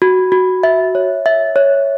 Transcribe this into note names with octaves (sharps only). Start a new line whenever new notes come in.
F#4
F#4
E5
C#5
E5
C#5